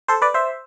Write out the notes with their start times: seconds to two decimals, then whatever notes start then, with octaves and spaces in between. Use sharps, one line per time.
0.08 A4 C5
0.22 B4 D5
0.34 C5 E5